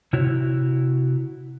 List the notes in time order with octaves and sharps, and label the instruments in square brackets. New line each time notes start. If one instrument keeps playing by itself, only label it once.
[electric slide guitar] C3 E4 F#4 C#5